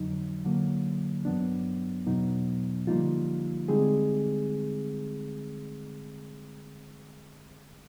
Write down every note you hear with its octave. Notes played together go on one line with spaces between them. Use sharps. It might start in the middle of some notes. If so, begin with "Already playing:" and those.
Already playing: F2 D3 F#3 D#4
D3 F#3 A#3
G2 D#3 F#3 B3 D4
E2 B2 F#3 B3 D#4
D3 F3 G3 A#3 D#4 F4
D3 G3 G#3 C4 D#4 G#4